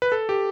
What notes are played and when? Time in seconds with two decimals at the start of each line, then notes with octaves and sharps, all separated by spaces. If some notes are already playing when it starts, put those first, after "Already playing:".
0.02 B4
0.12 A4
0.29 G4